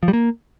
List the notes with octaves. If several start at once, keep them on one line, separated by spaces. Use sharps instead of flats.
F3
G3
A#3